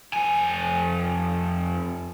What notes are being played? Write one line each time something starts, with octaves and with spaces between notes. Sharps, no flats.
F2 G#5